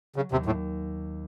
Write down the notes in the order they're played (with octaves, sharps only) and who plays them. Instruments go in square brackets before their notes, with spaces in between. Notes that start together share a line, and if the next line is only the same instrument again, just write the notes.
[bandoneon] C#3 [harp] F#3
[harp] D#2 [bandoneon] C3
[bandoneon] A2 [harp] A#3